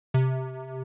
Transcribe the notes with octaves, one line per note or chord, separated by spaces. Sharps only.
C3